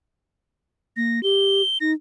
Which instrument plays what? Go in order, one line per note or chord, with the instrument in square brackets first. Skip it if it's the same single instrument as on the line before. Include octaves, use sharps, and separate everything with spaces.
[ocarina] A#3 [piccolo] A#6
[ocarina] G4 [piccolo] G7
[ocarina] D#4 [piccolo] A#6